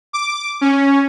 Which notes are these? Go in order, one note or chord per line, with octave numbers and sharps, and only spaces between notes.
D6
C#4